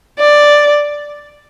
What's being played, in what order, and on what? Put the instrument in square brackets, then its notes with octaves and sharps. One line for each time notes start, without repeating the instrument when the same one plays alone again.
[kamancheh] D5